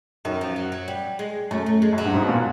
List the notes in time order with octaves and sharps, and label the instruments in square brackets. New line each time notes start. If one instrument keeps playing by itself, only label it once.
[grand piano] F#2 [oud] D#3
[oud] F3
F#3
F#3
G3
G#3
[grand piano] F#2 [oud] A3
[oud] A3
G#3
[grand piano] F#2
[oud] F#3
[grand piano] G2
G#2
B2
A#2